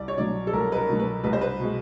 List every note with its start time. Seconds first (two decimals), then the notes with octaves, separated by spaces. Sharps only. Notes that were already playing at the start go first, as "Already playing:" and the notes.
Already playing: C2 D5
0.08 C#5
0.17 B2 F#3 D5
0.47 A4
0.53 C2 A#4
0.72 B4
0.76 A#4
0.89 B2 F#3
0.99 B4
1.24 C2 B4
1.33 C5
1.41 B4
1.60 B2 G#3